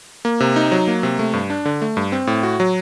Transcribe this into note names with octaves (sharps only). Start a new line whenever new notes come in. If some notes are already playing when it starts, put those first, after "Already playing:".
A#3
C3
D#4
F#3
A#3
C3
A3
G2
D4
D3
A3
G2
C4
A2
F#4
F#3